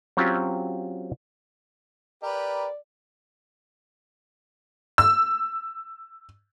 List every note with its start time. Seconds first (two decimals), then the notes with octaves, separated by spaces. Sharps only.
0.17 F#3 C4 C#4 F4 G4
2.23 G4 A#4 B4 D5
4.98 E6